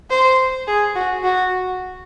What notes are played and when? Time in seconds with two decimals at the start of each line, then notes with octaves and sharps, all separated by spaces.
0.10 C5
0.67 G#4
0.95 F#4
1.24 F#4